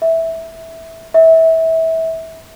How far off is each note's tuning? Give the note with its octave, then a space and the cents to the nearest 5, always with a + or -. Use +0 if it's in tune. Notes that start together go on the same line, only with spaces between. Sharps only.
E5 -10
E5 -25